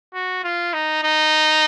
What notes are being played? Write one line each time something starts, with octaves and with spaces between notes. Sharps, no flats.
F#4
F4
D#4
D#4